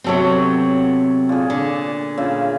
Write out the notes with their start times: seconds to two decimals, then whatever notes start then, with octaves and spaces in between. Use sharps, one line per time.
0.04 C3 F#3 B3 C4 A4 C#5
1.29 A#2 G#4
1.50 D3
2.18 A#2 C#3 E5